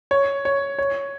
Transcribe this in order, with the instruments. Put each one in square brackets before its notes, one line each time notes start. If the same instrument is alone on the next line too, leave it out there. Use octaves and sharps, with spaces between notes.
[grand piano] C#5
C#5
C#5